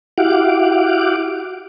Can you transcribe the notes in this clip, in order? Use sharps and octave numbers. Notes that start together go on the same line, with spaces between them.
E4 F#4 G4 F5 F#5 D6